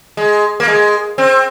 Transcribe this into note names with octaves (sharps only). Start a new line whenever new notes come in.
G#3
A#3
G#3
C4